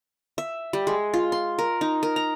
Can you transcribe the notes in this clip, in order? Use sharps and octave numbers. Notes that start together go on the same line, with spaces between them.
E5
G3
G#3
F4
C6
A#4
D#4
A#4
A#5